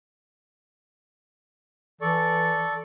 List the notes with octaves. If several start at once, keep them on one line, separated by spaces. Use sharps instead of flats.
E3 A4 D5 C#6